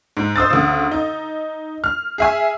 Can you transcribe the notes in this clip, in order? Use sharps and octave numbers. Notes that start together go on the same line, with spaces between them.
G#2
C5 D#6 E6 A6
D2 C#3
D#4
F6
G#4 E5 G#5